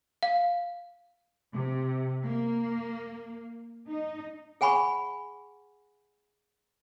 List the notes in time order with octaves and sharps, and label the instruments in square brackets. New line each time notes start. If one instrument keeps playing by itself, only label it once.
[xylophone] F5
[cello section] C3
A#3
D#4
[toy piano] G#4 F#5 G#5 B5 C#6